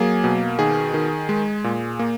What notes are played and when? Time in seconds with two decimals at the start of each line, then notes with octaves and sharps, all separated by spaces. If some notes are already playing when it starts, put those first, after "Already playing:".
Already playing: F#3 A#3 G#4
0.24 B2
0.59 D#3 G#4
0.94 D#3
1.29 G#3
1.64 A#2
1.99 A#3